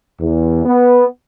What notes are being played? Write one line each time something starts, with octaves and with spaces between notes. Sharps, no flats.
E2
B3